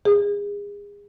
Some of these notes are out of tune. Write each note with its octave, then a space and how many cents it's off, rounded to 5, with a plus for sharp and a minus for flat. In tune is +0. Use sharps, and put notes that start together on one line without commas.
G#4 -30